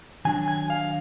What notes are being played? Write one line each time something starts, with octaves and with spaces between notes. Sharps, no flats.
D#3 F#3 D4 G#5
G#5
F5